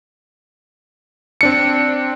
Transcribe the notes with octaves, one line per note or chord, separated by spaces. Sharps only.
C4 D4 C#7